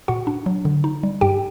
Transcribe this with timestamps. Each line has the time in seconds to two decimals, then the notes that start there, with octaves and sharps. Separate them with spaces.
0.08 A#2 F#4 F#5
0.27 D4
0.46 F#3
0.65 D3
0.84 D#4
1.03 G3
1.21 G2 G4 G5